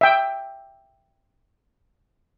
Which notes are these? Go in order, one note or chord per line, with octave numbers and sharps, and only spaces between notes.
E5 G5